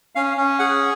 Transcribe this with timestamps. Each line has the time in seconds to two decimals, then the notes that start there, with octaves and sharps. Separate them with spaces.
0.15 C#4 F5
0.37 C#4
0.59 G#4 F#5